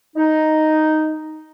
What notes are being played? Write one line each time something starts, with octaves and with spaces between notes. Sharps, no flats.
D#4